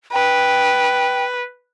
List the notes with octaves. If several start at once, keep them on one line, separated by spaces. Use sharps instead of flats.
B4 G5